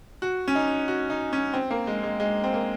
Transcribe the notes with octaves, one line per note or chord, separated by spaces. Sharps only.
F#4
C#4
D#4
F#4
D#4
C#4
C4
A#3
G#3
G#3
G#3
C4
A#3